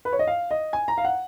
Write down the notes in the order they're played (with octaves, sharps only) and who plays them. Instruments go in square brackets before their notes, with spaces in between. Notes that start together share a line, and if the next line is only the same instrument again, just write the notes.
[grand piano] B4
C#5
D#5
F5
D#5
G#5
A#5
F5
F#5